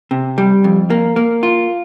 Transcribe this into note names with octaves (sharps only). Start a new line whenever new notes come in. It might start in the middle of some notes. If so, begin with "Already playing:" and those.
C3
G3
F2
A#3
A#3
F4